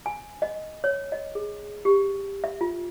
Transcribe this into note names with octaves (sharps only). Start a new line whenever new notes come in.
G#5
D#5
C#5
D#5
G#4
G4
E5
F4